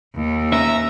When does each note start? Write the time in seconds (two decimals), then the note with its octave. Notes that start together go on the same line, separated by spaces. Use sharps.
0.15 D#2
0.52 C#4 B4 E5 A#5 E6